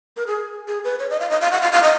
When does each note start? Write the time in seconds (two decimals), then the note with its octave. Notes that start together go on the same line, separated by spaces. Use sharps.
0.17 A#4
0.27 G#4
0.68 G#4
0.84 B4
0.99 C#5
1.10 D#5
1.20 F5
1.30 D#5
1.41 F5
1.51 F#5
1.62 F5
1.72 F5
1.83 D#5